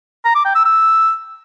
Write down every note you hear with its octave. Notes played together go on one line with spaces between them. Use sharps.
A#5
D6
G5
E6
E6